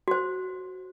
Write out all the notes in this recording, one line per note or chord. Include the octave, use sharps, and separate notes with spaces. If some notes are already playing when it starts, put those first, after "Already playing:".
F#4 C5